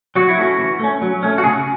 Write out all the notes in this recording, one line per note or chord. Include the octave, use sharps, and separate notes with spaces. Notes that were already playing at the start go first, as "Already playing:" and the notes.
F#3 F#4
E4
A3 C#4 F#4
E3
A3 C#4
F#3
A3 C#4
F#4
C#3 G#4